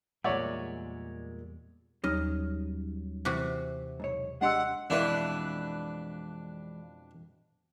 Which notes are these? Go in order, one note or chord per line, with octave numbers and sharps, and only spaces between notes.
E2 A#2 G3 G#3 C#5 D5 E5 F#5
D#2 F#3 G3 C#4 D#4 D#5 F6
C3 E3 F#4
B1 G#2 C#5
G#3 D4 G4 D#5 F#5 C6 E6
F2 B2 E3 G#3 D4 E4 B4 F5